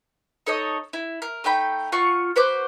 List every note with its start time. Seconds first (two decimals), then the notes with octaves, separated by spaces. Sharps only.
0.46 D#4 A4 C#5 D#5
0.93 E4
1.22 A#4
1.44 A3 D#4 G5 B5
1.92 F4 F5 F#5 C#6
2.36 F#4 B4 C5 D6